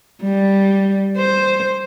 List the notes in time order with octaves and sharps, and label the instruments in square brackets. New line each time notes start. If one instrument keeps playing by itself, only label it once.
[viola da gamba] G3
C5